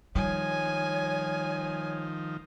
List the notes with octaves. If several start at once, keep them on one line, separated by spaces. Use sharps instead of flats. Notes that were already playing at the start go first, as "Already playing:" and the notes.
D#3 F3 G3 C#5 G#5